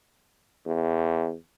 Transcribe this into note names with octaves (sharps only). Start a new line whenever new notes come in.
E2